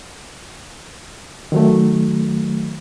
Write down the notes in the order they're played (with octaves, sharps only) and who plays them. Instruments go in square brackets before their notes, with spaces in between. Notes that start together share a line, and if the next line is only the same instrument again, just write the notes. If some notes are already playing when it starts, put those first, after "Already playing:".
[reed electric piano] D#3 F#3 A3